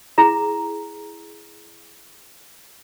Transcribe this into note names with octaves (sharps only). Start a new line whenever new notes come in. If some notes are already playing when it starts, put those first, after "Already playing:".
E4 G#4 A#5